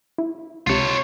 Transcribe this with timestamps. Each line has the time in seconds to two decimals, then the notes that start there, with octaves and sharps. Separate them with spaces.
0.18 E4
0.67 C#2 C3 F4 C#5